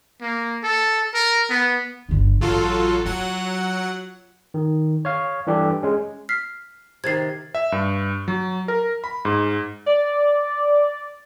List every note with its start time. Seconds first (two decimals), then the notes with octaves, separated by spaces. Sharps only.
0.21 A#3
0.63 A4
1.14 A#4
1.49 B3
2.09 G1 D3
2.41 A1 F#3 F4 A4
3.06 F#3 F4 F#5
4.54 D#3
5.05 C#5 F5
5.47 E3 G3 D4 G4 A4
5.83 G#3 C#4
6.29 F6 B6 C7
7.04 C3 D#3 G#6 A6 C7
7.55 E5
7.72 G2
8.28 F#3
8.68 A#4
9.04 B5
9.25 G#2
9.86 D5